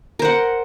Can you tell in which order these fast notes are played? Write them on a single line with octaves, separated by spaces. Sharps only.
A#4 C5 F#5